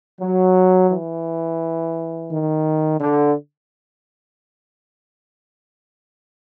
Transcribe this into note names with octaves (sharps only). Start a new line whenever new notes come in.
F#3
E3
D#3
D3